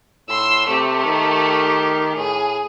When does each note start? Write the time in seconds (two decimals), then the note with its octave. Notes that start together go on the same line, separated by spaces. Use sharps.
0.29 A2 C6 E6
0.68 C3 A3 G4
1.05 D#3
2.16 A2 G#4